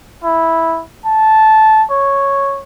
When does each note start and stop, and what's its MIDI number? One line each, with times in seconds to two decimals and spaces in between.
0.24 0.82 64
1.06 1.84 81
1.91 2.62 73